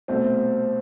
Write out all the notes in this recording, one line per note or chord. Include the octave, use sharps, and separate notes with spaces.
C2 B2 A3 C4